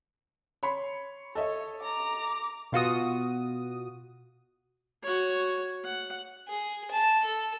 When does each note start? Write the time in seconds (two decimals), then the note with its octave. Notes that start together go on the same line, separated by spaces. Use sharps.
0.63 C#5 B5 C6
1.35 A4 C#5 D#5 E5
1.82 A#5 D6
2.72 B2 F4 F#4 D#6
5.03 F#4 C#5
5.84 F#5
6.48 G#4
6.91 A5
7.25 A4